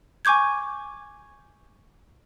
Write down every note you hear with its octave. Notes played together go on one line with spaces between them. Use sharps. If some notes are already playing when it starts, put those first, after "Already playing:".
G#5 C#6 D6 G6 G#6